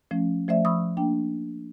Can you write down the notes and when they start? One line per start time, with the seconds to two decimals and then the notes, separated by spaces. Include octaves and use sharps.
0.11 F3 A3 C#4
0.48 F3 A3 C5 D5 E5
0.65 F3 B5 C#6 D#6 E6
0.97 A#3 D4 G5